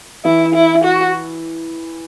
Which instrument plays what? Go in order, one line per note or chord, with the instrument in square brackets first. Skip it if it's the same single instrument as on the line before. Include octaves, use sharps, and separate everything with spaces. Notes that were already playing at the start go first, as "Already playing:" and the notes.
[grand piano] E3 [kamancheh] E4
[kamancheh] E4
F#4